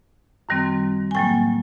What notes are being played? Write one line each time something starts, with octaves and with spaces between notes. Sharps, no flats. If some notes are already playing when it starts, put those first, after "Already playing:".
F#2 D#3 G3 C4
G#5
A2 F#3 A#3 G5